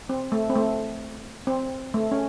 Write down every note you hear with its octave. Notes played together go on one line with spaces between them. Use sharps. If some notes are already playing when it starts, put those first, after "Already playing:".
C4
A3
C4
A3
C4
A3
C#4